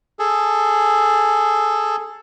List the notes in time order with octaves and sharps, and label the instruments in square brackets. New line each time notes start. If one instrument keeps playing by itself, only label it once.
[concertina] G#4 A4